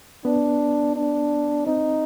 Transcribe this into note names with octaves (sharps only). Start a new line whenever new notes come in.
B3 D4
D4
C4 D#4